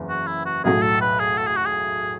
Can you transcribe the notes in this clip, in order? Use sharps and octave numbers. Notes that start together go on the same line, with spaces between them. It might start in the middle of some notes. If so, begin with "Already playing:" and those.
Already playing: F#1 E2
F#4
E4
F#4
B1 A2 F#3 A3 G#4
A4
B4
G#4
A4
G#4
F#4
G#4